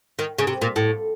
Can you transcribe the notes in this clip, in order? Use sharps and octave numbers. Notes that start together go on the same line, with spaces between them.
D#3
C#3
C3
A#2
A2